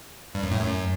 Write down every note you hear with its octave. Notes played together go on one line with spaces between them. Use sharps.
G2
F#2
A2
F#2